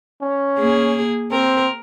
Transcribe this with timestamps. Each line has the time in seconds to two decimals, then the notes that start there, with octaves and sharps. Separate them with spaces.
0.22 C#4
0.58 A#3 G#4
1.31 C4 A#4